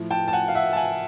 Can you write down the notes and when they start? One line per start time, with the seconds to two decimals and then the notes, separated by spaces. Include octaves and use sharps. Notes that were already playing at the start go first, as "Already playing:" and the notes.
Already playing: A2 F3
0.11 G5 A5
0.28 A5
0.33 F#5 G#5
0.48 F5
0.55 E5 F#5
0.73 A5
0.77 F#5 G#5